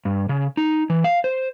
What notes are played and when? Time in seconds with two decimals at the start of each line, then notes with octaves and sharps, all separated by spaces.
0.05 G2
0.29 C#3
0.57 D#4
0.90 E3
1.04 F5
1.24 C5